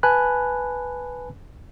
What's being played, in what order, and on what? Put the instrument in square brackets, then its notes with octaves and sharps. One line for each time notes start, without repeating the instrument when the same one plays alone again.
[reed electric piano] B4 G#5 A5 B5 F#6